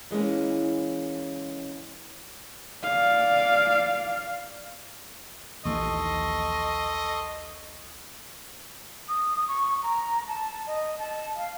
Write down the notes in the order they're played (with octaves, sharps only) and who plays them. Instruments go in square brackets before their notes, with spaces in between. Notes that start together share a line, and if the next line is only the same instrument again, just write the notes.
[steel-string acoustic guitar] E3 G#3 A#3 C#4
[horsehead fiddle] D5 F5
[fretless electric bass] A#1 D#2 E3 [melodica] A4 C6 C#6 [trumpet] D#5
[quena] D#6
C#6
A#5
A5
D#5
A5
F5